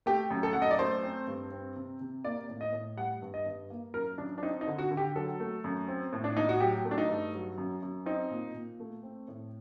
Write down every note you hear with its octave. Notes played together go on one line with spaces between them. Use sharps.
A3 G4
F#2
A4
F#2 F#5
D#5
D5
A3 C5
C4
G2
C4
C3
C3
A#3 D5
A2
D#5
A2
G3 F#5
G2
D#5
G2
A#3
F#2 A#4
F#2 D4
D4
C4 D#4
D#4
D3
F#4
D3
G4
F#3 A4
A3
F#2
C4
A2
D4
A2 D#4
F#4
F#3 G4
A3
D4
D#4
G2
F#3
F#2
F#2
C4 D#4
A#2
A#2
A3
C4
A2